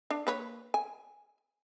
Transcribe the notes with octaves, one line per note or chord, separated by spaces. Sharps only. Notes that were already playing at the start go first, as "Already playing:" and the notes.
D4
A#3 B4 C#5
G#5